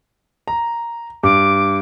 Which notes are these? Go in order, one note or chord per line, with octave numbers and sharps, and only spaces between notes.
A#5
G2 D6